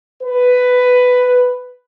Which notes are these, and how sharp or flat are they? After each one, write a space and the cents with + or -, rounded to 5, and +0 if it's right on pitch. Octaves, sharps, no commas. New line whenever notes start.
B4 +10